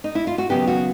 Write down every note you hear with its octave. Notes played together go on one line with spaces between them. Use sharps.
D#4
E4
F4
F#4
D#2 C#3 F#3 B3 G4
F#4